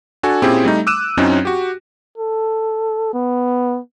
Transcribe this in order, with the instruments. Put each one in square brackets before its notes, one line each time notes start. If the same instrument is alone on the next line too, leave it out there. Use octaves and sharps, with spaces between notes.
[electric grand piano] D4 F#4 A4 G#5
A#2 C4 C#4 E4 G4 G#4
G3 A3 D#4
D6 E6 F#6 D#7 E7
F#2 F#3 C4 C#4 D#4 E4
F#4 G4
[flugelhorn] A4
B3